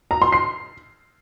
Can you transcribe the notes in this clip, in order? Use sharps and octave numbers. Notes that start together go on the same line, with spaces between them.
A#5
C6
C7